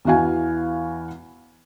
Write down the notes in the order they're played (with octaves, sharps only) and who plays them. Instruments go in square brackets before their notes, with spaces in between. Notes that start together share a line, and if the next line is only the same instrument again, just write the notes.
[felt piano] E2 E3 F#4 F5 G#5